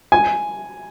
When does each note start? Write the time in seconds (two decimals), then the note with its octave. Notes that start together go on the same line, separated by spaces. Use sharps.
0.12 G#5